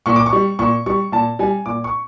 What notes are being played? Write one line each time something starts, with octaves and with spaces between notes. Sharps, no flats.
A#2 C#6
D6
C#6
G3
A#2 C#6
G3 C#6
A#2 A5
G3 G#5
A#2 D6
C#6